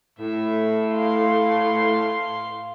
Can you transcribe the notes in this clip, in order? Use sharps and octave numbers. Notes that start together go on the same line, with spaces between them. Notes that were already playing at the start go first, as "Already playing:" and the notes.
A2 E5
F5 C6